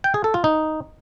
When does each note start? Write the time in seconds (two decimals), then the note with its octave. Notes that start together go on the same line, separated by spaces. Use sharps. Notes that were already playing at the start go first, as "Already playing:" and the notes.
0.04 G5
0.14 G#4
0.24 A4
0.34 F4
0.44 D#4